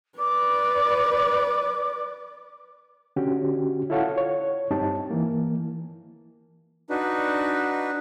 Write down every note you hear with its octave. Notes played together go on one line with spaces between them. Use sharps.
B4 D5 D6
D3 C#4 F#4 G4
E4 F4 A4 C#5 F5 F#5
C#5
G2 C4 D#4 G4 A5
E3 A#3
D4 D#4 F#4 B4